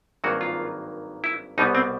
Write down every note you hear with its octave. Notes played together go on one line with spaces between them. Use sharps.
G#1 G2 D#3 F#3 A#3 F#4
F4
E4
C2 B2 G3 B3 D#4
C4